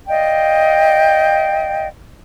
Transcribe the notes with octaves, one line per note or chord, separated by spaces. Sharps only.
D5 D#5 F5 G5